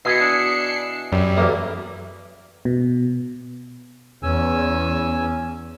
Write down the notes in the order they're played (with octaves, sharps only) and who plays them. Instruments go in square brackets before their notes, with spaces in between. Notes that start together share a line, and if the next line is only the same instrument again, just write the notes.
[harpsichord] B2 [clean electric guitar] E4 G#4 D#5 [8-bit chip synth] C7 C#7
[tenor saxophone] D4
[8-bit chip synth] F#2 [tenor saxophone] G3
[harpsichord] B1 E2 A3 [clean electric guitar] A#3
[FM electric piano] B2
[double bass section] E2 [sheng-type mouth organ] C#4 G#5 E6